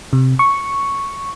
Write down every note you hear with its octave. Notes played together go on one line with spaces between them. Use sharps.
C3
C#6